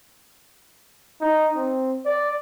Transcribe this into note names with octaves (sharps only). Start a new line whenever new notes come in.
D#4
C4
D5